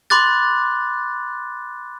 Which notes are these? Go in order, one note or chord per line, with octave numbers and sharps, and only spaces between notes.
B5 C6 D6 F#6 A6